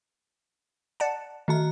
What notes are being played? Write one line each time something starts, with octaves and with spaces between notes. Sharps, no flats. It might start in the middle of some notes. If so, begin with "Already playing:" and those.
D5 F#5 A5
D#3 A3 F#4 A#5